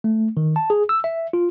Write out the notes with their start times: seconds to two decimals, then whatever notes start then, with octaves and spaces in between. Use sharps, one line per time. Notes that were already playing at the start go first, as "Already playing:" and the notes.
0.04 A3
0.37 D#3
0.56 A5
0.70 G#4
0.89 E6
1.04 E5
1.33 F4